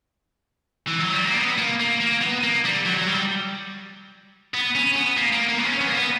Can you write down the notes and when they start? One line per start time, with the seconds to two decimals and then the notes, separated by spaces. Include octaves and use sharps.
0.88 E3
1.00 F#3
1.13 G3
1.25 A#3
1.37 B3
1.58 A#3
1.80 A#3
2.01 A#3
2.21 B3
2.43 A#3
2.64 G3
2.85 F#3
2.97 F#3
3.07 G3
4.54 B3
4.75 C#4
4.96 B3
5.17 A#3
5.32 A#3
5.49 A#3
5.58 B3
5.64 C#4
5.81 B3
5.90 A#3
5.97 B3